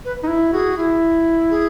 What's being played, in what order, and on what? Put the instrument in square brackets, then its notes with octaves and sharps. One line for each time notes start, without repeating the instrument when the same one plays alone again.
[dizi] B4
[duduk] D#4
E4
[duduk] F#4 [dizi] G#4
[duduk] E4
[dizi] G#4